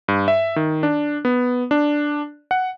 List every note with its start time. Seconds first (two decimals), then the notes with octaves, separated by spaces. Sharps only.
0.08 G2
0.28 E5
0.56 D#3
0.83 D4
1.25 B3
1.71 D4
2.51 F#5